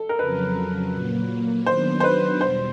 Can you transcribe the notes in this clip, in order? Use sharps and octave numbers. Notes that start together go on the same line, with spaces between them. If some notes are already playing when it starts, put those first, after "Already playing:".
Already playing: A4
A#4
F2 C#3 F#3 B4
A#2 F#3 A#3
D#3 F#3 B3 D4 C5
C5
B4
E2 B2 G3 C5